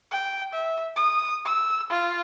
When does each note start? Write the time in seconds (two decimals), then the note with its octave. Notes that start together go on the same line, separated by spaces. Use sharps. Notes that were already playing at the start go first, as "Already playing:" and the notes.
0.12 G5
0.53 E5
0.96 D#6
1.45 E6
1.90 F4